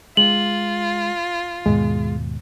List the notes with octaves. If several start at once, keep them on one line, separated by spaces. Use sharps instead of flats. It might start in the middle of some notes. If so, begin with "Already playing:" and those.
G#3 F4 F#7
D#2 G#2 B2 G#3